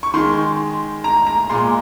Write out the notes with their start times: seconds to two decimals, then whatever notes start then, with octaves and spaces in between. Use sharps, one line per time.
0.03 C#6
0.14 D#3 G#3 C6
1.04 A#5
1.27 A#5
1.50 A#2 G#3 C6